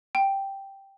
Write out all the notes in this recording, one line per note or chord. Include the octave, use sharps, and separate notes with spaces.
G5